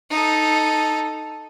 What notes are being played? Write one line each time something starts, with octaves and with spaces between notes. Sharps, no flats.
D#4 A4